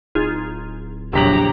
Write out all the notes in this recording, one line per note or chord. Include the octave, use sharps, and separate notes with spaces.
D1 D#4 F4 G#4
A#1 E2 C#3 F#3 G4 A#5 B6 F#7